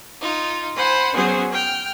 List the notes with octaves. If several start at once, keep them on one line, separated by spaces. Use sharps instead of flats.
D#4 F4
C5 F#5 G#5 B5
F#3 B3 C#4 F#4 G#4 C5
G5 F6